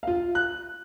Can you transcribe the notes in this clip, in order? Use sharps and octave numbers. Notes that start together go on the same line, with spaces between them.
F4 F5
F#6